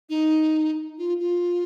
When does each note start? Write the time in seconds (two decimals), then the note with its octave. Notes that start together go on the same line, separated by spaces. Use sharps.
0.09 D#4
0.98 F4
1.19 F4